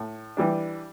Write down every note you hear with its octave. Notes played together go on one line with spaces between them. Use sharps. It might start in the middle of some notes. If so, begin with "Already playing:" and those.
Already playing: A2
E3 G3 D4